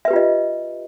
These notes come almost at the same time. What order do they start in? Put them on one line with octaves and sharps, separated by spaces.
E5 B4 G4 F4 D#5